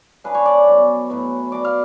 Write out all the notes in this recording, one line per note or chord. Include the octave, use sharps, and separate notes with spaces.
C#3 G#3 D4 B4
C#5
D5
B2 F#3 C#4
A2 F#3 B3
B2 F#3 B3 D5
F5